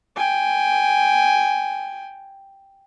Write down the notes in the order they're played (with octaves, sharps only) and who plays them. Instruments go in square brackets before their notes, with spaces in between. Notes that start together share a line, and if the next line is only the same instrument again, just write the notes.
[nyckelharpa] G5 G#5